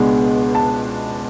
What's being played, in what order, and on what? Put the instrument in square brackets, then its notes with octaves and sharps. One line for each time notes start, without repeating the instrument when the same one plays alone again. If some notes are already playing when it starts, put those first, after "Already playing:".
Already playing: [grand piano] C#2 B2 G#3 B3 D4
A5